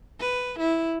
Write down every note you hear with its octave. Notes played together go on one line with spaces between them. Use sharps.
B4
E4